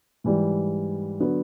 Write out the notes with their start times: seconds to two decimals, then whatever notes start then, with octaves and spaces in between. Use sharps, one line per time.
0.24 G#2 E3 G3
1.20 D3 F#3 B3